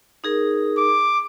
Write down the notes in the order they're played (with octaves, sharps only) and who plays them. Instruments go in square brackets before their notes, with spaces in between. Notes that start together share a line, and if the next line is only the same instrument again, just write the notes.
[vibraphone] D#4 G#4 A#4
[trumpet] D6